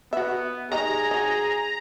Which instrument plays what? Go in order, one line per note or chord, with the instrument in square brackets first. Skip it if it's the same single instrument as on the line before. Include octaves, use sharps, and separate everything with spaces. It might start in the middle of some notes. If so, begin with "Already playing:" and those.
[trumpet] B3 [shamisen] F#4 E5
[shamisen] D#3 G3 D#4 [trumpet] G#4 [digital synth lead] A#5
[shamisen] F#3 D#4